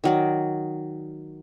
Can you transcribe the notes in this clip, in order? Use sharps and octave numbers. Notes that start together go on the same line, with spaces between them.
D#3 F#3 D5